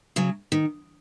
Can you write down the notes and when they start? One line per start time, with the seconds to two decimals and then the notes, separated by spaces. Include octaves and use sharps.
0.16 C#3 F#3
0.52 D#3